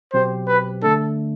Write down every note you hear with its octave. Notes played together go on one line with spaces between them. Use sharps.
B2 F#3 C4 G4 C5
B4
D3 A3 D4 A4